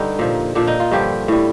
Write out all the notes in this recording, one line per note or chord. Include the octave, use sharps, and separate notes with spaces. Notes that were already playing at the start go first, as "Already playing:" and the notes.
Already playing: G2 D3 D#4 G4
A#2 F3
A#2 F3 D4
D#4
F4
G2 D3 F3 G4
A2 G3